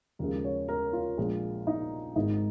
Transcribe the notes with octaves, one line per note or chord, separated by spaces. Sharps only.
D#2 C#3 F3 G#3 A#4
C#5
A#4
F4
A#1 A#2 G#3
D#4
G#1 G#2 D#3 G#3 D#4